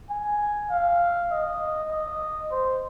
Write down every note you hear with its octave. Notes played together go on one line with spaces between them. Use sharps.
G#5
F5
D#5
D#5
C5